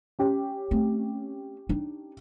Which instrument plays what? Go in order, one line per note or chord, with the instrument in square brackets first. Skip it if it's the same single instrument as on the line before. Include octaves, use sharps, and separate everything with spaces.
[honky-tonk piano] C#4 G4
[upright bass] A3 C4
D4 D#4